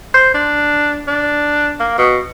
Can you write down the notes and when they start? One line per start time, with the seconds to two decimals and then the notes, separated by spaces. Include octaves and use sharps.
0.14 C5
0.34 D4
1.08 D4
1.80 A#3
1.98 B2